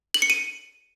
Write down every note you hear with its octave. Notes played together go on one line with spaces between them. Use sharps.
F#7
C#7
D#7